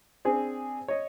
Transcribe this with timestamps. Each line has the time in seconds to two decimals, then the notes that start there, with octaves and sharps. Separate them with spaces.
0.25 C4 D4 G#4
0.88 C#5 D#5